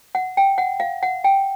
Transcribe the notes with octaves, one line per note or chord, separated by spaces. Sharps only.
F#5
G5
F#5
F5
F#5
G5